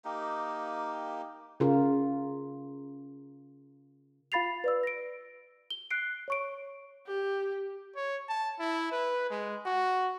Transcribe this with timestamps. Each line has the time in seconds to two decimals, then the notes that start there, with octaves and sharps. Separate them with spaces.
0.05 A#3 D#4 G4
1.60 C#3 F4 A#4
4.32 F4 F5 B5 A6 C7 F7
4.64 B4 D5 E6
4.83 A#6 D7
5.70 G7
5.91 F#6 C7 D7
6.28 C#5 C#6 D7
7.07 G4
7.96 C#5
8.29 A5
8.60 E4
8.92 B4
9.30 G#3
9.66 F#4